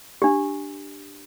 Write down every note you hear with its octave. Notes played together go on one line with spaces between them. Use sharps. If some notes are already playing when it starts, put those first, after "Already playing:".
D4 G4